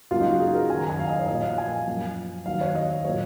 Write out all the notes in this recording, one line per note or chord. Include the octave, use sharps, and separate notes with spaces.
C#2 C#3 F#3 A#3 F4
D#4
F#4
G#4
A#4
F#2 D#3 F#3 G#5
A#5
G#5
F5
D#5
C#5
A#2 F3 A#3 D#5
F5
G#5
F#2 F3 A#3
D#2 D#3 F#3 F5
C#5
D#5
D#5
A#2 F#3 A#3 C#5